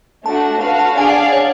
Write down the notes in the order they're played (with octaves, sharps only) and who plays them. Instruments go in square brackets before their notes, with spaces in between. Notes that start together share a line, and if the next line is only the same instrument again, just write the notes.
[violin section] A3 D4 F#4 [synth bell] A5
[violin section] F#4 B4 F5 [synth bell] A5
[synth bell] A5
[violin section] D4 G#4 D5 F5 [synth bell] G#5
[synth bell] F#5
C#5